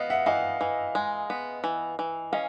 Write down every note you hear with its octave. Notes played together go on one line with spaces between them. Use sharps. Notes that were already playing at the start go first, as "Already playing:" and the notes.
Already playing: B3 D#5 F5
E5 F#5
E3 D#5 F5
E3
G#3
B3
E3
E3
C#4 D#5 F5